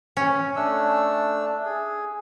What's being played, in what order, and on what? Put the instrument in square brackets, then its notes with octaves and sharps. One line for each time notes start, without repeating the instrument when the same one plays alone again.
[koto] C#4
[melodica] A3 D4 E6
G#4